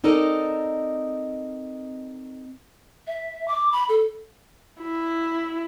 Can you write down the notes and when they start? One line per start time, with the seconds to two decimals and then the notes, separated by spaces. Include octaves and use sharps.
0.04 C4 D#4 A4 A#4 D5 D#5
3.07 E5
3.48 D6
3.72 B5
3.89 A4
4.81 E4